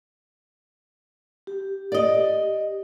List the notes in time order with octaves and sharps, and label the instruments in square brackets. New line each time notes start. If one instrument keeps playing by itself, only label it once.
[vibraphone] G4
[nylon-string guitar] D5 D#5